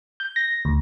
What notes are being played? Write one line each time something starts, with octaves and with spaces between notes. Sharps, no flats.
G6
A#6
D2